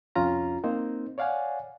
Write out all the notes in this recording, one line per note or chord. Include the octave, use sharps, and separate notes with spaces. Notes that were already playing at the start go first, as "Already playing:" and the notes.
C2 F2 C#4 F4 A#5
A#3 C4 D#4 C5
C#5 D5 F5 F#5 G#5